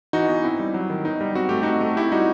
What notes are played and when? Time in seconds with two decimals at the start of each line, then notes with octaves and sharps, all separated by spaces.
0.13 E3 D#4 F#4
0.29 B3
0.44 C4 E4
0.60 G3
0.74 F#3
0.90 D#3
1.05 B3 D#4
1.21 G3
1.35 C4 F#4
1.49 A3 G4
1.63 C4 D#4 F#4
1.81 A3
1.97 C4 E4 G4
2.12 G3 D#4 F#4